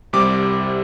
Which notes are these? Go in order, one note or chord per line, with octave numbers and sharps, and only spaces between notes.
C2 C3 G3 D6